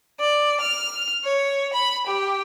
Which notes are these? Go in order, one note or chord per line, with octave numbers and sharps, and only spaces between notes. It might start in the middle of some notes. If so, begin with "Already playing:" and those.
D5
F6
C#5
B5
G4